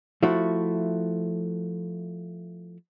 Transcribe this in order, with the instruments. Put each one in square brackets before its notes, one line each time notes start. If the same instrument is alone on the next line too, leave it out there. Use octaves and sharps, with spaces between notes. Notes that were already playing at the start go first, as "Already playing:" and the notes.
[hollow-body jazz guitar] F3 A3 E4 F#4